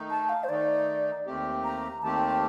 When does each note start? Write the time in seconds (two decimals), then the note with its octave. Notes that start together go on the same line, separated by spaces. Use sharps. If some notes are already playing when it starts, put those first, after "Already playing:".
Already playing: D#3 A3 D#4
0.10 A5
0.29 F5
0.44 C5
0.49 D#3 A3 D#4 D5
1.26 D#2 D#3 A3 C4 G4
1.64 A#5
2.02 D#2 D#3 A3 C4 G4 A5